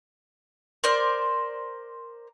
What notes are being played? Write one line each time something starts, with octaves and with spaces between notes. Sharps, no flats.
A#4 C5 D5 C6